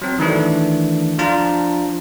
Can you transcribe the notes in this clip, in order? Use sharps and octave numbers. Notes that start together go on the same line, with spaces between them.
F#3 C4
D#3 E3 A3 D4
F3 D4 F4 A5 A#5